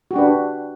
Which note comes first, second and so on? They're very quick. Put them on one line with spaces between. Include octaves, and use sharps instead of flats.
F#4 G4 D4 B4